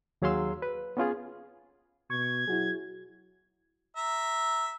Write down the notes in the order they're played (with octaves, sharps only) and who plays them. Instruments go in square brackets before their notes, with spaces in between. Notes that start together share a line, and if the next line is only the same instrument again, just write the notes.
[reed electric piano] D#2 F#3 G#4 F5 C6 E6
B4
B3 C#4 F4 G#4
[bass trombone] B2 [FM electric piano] C#6 [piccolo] G#6
[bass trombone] F#3 [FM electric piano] E4 F#4 G#4
[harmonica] E5 A#5